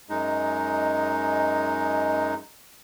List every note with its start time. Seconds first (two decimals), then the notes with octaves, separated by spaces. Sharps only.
0.10 F#2 G#3 D#4